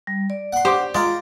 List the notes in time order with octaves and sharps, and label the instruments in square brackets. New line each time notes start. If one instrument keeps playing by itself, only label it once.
[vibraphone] G3
D5
[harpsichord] F#5 C6
[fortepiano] G4 D6 [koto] C5
[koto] G#3 [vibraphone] F4 [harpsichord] D5 F5 A#5